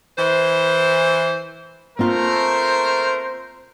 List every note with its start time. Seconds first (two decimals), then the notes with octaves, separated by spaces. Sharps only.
0.17 E3 C5
1.99 A3 A#3 C4 F4 A#4 C5